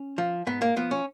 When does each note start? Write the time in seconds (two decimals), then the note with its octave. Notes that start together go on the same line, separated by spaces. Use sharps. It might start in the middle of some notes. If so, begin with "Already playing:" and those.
Already playing: C#4
0.18 F3
0.47 G#2 B3
0.62 A#3
0.76 F3 B3
0.91 C#4